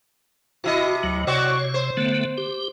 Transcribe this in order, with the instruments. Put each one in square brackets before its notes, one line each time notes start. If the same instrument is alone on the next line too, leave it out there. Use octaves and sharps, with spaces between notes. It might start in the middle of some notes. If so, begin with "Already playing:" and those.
[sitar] C3 E4 D#5 [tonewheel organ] F#4
[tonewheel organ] D2 F#3
[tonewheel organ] C3 C#5 [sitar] C4 F#4 D5
[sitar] C5
[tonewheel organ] D3 A3 B3
G4